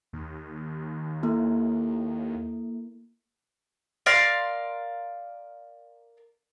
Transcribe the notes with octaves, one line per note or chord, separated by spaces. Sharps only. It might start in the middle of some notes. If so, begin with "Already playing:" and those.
D#2
A#3 E4 A4
A#4 D5 F5 C6